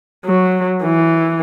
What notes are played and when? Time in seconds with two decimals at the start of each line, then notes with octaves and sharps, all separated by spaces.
0.25 F#3
0.83 E3